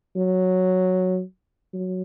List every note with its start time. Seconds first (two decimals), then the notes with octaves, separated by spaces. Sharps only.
0.16 F#3
1.74 F#3